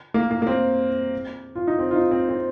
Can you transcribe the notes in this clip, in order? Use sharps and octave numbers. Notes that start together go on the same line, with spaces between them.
A#3
A#3
A#3
C4
F4
D#4
C4
F4
D#4
C4
C4